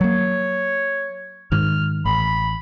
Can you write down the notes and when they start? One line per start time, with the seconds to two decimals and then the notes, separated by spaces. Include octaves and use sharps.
0.01 F#3 A#3 C#5
1.52 G#2 D#3 F6
2.05 A1 B5